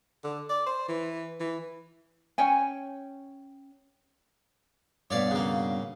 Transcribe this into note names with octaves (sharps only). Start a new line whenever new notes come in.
D3
D5
C5
E3
E3
C#4 C#5 G5 G#5
G2 B2 C#5 D5 F5
C#3 A#3